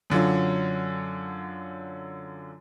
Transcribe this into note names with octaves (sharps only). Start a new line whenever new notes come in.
F#2 D3 F#3 F4